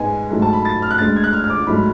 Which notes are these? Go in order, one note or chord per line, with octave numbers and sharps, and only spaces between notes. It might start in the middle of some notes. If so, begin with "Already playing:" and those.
Already playing: G#2 G#3 B3 G#5
G#2 F#3 A3
A5
B5
A6
F6
F#6
D2 D3 G#3 A6
G#6
F#6
F6
F6
D6
G#2 F#3 A3 B5